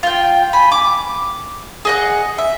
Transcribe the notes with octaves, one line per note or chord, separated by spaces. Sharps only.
F4 G5
G#5 B5
D6
G#4 D#5 F#5
E5